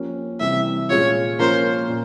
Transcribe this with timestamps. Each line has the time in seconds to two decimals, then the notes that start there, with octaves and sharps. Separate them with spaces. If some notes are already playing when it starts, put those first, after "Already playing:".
Already playing: F3 A#3 C#4 G4
0.40 C3 E3 G3 E5
0.90 A#2 G#3 C#4 F4 C#5
1.39 F3 A#3 C#4 F4 A#4 C5
1.89 A#2